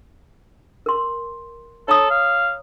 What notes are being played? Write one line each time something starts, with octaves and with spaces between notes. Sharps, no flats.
A#4 C6
A4 C#5 A#5 D#6
F5